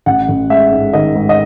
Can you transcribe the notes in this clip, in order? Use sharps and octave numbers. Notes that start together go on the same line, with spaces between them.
A1 F#5
A1
G#3 E5
G#2
D#3 D#5
G#2
D#5